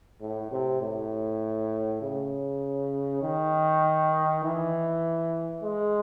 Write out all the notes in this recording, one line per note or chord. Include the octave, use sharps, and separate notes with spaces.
A2
C3
A2
C#3
D#3
E3
G#3